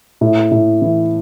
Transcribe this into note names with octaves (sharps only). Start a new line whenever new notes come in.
A2
A2
E3